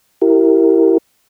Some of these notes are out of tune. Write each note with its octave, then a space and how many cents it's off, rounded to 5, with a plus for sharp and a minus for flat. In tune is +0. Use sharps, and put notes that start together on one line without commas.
E4 +0 G4 -20 A#4 -15